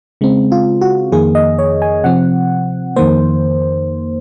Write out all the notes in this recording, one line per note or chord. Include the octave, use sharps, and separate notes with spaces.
C#3 G#3 C4
F4
F#4
F2 D#3 A#3 G#4
D#5
C#5
G#5
C3 F3 C4 F#5
F2 D#3 A#3 C5